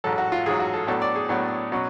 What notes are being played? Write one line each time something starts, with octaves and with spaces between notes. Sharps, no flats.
A1 G#2 F#3 A4
F#4
F4
A1 G#2 F#3 G#4
F#4
A4
A2 F#3 B3 D4 A4
D5
G#4
A2 F#3 B3 D4
B2 F#3 C#4